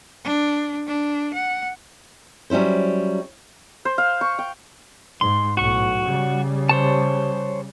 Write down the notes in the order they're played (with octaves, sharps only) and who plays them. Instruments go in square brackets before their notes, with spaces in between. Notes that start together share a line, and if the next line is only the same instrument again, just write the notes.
[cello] D4
D4
F#5
[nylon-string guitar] F#3 G3 C#4 E4 C5
[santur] C5
F5
C#6
G5
[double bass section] G#2 [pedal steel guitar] C6
[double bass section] B1 A2 [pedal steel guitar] F#4 C#6
[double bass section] C#3 G3
[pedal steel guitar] C5 C#5 A5